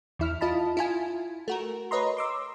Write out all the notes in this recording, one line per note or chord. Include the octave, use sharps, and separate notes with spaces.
E2 E4 F6
E4 F4 D#5 A5 B5
E4 F4 G#5
A3 F#4 A#4
B4 C#5 D#5 A#5 C6
C6 D6 E6